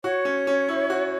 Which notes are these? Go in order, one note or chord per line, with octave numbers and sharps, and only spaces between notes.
F#4 C#5
C#4
C#4
E4
F#4